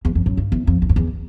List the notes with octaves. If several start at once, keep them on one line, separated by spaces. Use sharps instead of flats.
E2
F2
F#2
G2
E2
F2
E2
F2
E2